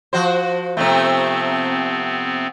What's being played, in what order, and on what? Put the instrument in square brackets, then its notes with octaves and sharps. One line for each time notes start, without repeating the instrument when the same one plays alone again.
[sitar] F3 F#4 C5
[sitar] C3 F3 A3 [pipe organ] B3 C4